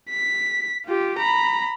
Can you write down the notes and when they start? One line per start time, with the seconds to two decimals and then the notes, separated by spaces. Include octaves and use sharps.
0.10 B6
0.86 F4 G4
1.19 A#5 B5